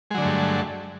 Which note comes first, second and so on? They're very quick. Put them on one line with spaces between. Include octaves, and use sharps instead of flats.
G#3 F#3 D3 A3 G2